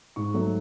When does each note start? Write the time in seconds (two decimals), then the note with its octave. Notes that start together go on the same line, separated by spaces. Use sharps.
0.16 G#2 C#6
0.34 F#3 A3